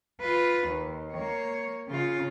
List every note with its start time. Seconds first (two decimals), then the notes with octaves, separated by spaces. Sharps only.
0.21 F4 B4
0.67 D#2
1.14 A#3 C#5
1.88 C#3 F4